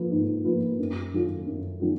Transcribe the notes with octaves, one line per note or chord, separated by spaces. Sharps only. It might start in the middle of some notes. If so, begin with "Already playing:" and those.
Already playing: F3 A#3 F4 B4
G#2
F3 A#3 F4 B4
F#2
D#3 F#3 C#4 F4
F#2
D#3 F#3 C#4 F4